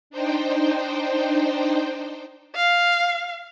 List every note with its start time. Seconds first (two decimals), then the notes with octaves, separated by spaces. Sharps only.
0.10 D4 D#4 C5 G5
2.56 F5